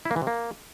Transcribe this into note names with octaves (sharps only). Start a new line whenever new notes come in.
E4
A#3
E3
C3
A#3